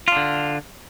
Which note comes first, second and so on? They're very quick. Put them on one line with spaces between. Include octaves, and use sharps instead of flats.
F4 D4 D3